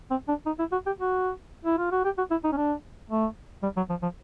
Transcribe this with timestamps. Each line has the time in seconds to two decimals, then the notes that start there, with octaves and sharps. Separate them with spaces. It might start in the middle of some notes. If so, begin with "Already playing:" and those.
0.10 C4
0.28 D4
0.46 D#4
0.59 E4
0.72 F#4
0.86 G4
0.99 F#4
1.65 E4
1.78 F4
1.92 F#4
2.05 G4
2.18 F#4
2.31 E4
2.44 D#4
2.52 C#4
2.57 D4
3.10 A3
3.63 G3
3.77 F#3
3.90 F3
4.02 F3